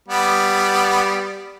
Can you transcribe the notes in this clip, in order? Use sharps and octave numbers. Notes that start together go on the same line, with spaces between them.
G3 B3